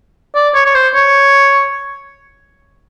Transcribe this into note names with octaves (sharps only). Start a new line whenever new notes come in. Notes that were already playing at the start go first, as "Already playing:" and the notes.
D5
C#5
C#5
C5
C#5